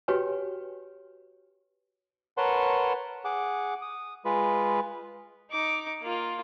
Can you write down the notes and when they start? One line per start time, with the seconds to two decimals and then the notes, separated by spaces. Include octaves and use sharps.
0.08 F#4 G4 B4 C#5 G5 G#5
2.37 A#4 B4 C#5 F#5 A5 C6
3.25 G#4 F#5 D6
3.82 D#6
4.25 G#3 F4 B4
5.51 D#4 D6
6.02 A#3 F4